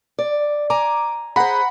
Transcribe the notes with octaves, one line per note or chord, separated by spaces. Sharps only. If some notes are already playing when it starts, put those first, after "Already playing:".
D5
G#5 A#5 D6
G#4 C5 F#5 A#5 B5